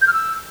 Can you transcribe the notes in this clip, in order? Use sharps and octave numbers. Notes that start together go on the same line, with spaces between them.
G6
F6
E6